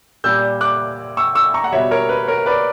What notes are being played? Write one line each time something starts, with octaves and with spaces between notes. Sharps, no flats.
A#2 G3 E6 G6
D6 F#6
C#6 E6
C#6 E6
A#5 C#6
F#5
B2 G3 C#5 E5
A#4 C#5
B4
A#4 C#5
B4 D5